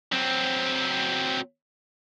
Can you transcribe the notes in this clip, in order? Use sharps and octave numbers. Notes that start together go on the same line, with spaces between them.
F#3 C4